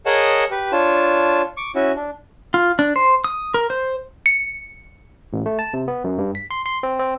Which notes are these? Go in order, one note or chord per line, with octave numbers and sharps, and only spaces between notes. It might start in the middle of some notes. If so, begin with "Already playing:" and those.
G#4 A#4 C#5 D#5 F#5 A5
G4 B4
D4 F4 C#5 A5
C#6 D6
C#4 E4 F#4
D4
F4
D4
C5
D#6
A#4
C5
C#7
A1
A3
A5
C3
B3
F#2
G2
B6
C6
C6
C4
C4